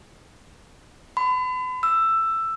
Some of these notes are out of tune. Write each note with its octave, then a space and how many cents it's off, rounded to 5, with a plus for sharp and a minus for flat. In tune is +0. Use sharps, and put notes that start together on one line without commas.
B5 +40
E6 +10